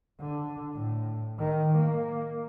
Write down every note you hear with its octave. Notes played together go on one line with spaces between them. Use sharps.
D3
A2
D#3
A#3